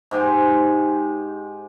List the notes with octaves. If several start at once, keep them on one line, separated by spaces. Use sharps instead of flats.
G#2 G4 G#4 C6